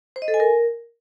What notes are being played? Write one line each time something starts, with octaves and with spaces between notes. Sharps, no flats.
C5
D#5
A4
G#5
A#4